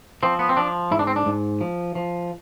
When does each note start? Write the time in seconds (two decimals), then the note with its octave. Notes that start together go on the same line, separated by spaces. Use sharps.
0.23 F3 C4
0.39 B3
0.49 C4
0.57 F3 D4
0.91 G#2 E4
0.99 D4
1.07 C4
1.16 D4
1.26 G#2
1.61 F3
1.95 F3